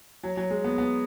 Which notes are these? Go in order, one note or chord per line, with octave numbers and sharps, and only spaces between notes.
F#3
F#3
G#3
B3
B3